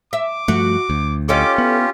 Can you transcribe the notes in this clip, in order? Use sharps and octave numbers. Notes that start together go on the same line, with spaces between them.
E5 D6
G2 F3 A3 F#4
D2
C#4 F4 G4 A4 C#5 D#5 D6
B3 E4